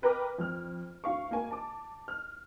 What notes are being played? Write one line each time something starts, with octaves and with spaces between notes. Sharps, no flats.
A#4 B4 G5 A#5 D6 F6
F2 F6
D2 F5 C#6
A#3 A#4 G#5
A5 D6
F6